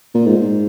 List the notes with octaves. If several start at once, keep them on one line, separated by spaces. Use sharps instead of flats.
A#2
G#2